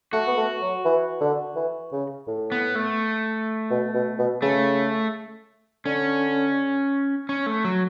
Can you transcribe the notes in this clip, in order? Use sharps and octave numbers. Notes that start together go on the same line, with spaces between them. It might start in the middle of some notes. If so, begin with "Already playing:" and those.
A3 F#4
B3
A3
F#3
E3
D3
E3
C#3
A2
B3
A3
B2
B2
B2
C#3 A3
D3 C#4
C#4
A3
F#3